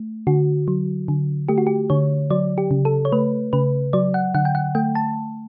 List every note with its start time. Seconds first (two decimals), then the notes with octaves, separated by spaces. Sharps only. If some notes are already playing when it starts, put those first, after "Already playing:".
Already playing: A3
0.27 D3 F#4
0.68 F#3
1.08 D3
1.49 A3 G4
1.58 F#4
1.67 G4
1.90 D3 C#5
2.30 F#3 D5
2.58 G4
2.71 C#3
2.85 A4
3.05 C#5
3.12 A3 B4
3.53 C#3 B4
3.93 F#3 D5
4.14 F#5
4.35 D3 F#5
4.45 G5
4.55 F#5
4.75 A3 G5
4.95 A5